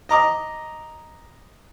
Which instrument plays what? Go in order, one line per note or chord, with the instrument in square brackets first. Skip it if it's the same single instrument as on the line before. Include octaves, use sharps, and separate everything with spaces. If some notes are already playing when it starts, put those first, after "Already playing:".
[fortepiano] D#5 A#5 D6 D#6